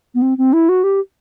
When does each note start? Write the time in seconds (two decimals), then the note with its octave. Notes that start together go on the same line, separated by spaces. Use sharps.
0.15 B3
0.22 C4
0.38 C4
0.53 E4
0.69 F#4
0.84 G4